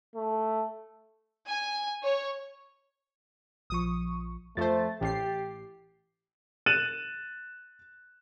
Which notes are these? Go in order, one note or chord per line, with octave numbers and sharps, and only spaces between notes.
A3
G#5
C#5
A#1 F3 C#6 D#6
F2 A3 C5 A6
A1 G4 C7
F#6 A6 D#7 E7 F#7